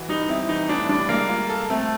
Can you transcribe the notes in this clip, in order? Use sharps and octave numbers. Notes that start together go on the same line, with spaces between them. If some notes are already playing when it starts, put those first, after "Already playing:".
Already playing: E3 F#4
G3 D#4
C4 E4
E3 D#4
A2 D4
G3 D4
G#3 A#3
F4
A4
A3 C4